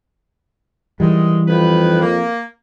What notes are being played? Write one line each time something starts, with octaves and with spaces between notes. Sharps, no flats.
G#2 D#3 E3 G3 G#3
F2 D#3 F3 B4
A#3